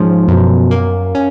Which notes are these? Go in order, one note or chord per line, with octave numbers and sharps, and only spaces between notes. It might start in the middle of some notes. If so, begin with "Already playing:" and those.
Already playing: G#2 F3 C#4
F#2 B2
A#3
C#4